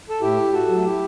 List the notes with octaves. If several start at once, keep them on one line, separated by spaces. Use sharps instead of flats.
A4
A2 E4 G4
F#4 A4
F#3 A3
F#4
E4 G4